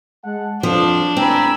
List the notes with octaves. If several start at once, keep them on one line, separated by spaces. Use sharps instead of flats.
G#3 F#5 A5
F2 F3 D4
A2 D3 C4 G#5 A#5 B5 E6